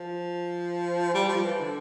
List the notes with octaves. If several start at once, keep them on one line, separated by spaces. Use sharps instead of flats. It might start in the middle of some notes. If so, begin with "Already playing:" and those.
Already playing: F3
G3
F3
E3
D3